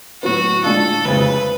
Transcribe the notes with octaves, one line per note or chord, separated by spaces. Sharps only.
A2 F#3 B3 F#4
A2 G#3 D4 F4 A4
F1 F2 C#3 G#3 B4